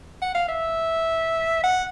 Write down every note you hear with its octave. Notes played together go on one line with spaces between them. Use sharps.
F#5
F5
E5
F#5